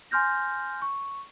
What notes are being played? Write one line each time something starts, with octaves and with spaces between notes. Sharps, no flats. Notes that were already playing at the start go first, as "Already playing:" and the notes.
G#5 C6 F6 G6 A#6
C#6